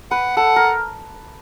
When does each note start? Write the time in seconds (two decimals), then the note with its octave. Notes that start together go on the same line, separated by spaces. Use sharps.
0.11 B4 F#5
0.37 A4 F#5
0.56 A#4